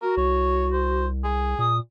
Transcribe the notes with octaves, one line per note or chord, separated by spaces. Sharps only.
F#4 A#4
C2 C#5
C5
G#4
A#2 D#6